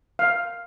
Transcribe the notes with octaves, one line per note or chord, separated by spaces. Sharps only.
F5